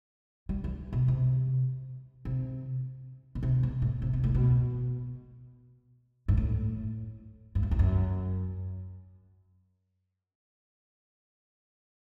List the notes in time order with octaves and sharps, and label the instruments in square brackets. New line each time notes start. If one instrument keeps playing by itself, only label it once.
[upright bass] G3
E3
B2
C3
C3
B2
C3
B2
A2
C3
B2
A2
B2
G2
A2
G2
F#2
E2
F#2